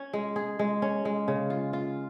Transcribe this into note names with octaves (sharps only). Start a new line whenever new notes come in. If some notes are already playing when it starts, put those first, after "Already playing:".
Already playing: C#4
G#3
G#4
G#3
C#4
G#3
C#3
F4
F4